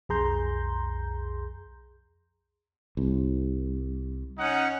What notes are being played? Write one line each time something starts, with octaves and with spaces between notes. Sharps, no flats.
B1 F2 G#4 A#5 C6 G6
C2
C#4 D#4 F#5